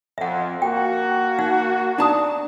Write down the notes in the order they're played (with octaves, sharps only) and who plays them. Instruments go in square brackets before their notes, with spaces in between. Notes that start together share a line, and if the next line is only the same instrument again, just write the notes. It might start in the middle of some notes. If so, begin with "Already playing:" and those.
[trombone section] F2 [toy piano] E5 F#5
[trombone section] A#3 F#4 [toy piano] G5
[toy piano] D#4 F#5
[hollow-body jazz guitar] D4 A5 [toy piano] D#4 A#5 D#6